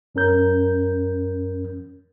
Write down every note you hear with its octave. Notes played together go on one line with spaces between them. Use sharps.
F#2 C#4 A#4 G6